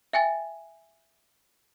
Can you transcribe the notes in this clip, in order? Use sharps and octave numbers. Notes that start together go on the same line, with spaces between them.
E5 G5 G#5 A6